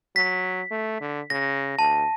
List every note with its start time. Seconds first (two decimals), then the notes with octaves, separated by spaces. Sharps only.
0.16 F#3 B6
0.71 A3
1.01 D3
1.30 C#3 A#6
1.79 D2 A5